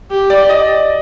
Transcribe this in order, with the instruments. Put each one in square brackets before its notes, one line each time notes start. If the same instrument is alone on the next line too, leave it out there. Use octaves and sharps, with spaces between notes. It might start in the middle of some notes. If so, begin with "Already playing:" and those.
[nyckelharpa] G4
[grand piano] D5
D#5